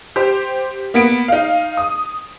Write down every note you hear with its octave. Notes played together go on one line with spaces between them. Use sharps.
G4 C5
A#3 B3 D7
D#4 F5
D#6